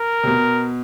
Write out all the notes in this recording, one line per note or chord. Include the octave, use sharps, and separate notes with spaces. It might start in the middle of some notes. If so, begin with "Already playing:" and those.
Already playing: A#4
C3
B2